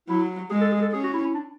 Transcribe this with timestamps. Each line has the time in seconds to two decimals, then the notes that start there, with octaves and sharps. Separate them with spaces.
0.08 F#3 E4
0.50 G#3 G#4
0.61 A4
0.72 G#4
0.81 A4
0.92 C#4 G#4
1.03 F#4
1.13 E4
1.24 E4
1.34 D4